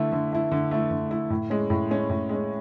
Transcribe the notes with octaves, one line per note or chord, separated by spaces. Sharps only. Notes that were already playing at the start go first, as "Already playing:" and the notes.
Already playing: D3 A3 E4
D3
A3 E4
D3
A3 E4
D3
A3 E4
A2
G#3 C#4
A2
G#3 C#4
A2
G#3 C#4